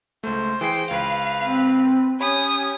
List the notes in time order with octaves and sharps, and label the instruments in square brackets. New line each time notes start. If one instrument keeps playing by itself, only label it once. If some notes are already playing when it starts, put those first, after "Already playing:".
[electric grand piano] C#2 A3 [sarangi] C5
[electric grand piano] E3 G#4 C7 [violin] G5
[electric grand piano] C#2 [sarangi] B4 [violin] F5
[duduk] C4
[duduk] C#4 [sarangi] G4 [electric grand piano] C#5 B5 [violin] G#5 D#6